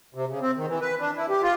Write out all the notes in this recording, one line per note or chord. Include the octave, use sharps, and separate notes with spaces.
C3
C#3
C4
D#3
E3
B4
D4
E4
G4
F4